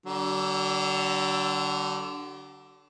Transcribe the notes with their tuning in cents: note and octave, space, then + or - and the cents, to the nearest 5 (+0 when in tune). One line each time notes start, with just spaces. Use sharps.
D3 +0 F#3 +45